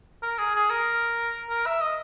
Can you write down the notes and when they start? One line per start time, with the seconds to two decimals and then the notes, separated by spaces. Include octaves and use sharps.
0.23 A#4
0.38 G#4
0.55 G#4
0.70 A#4
1.49 A#4
1.66 E5
1.81 D#5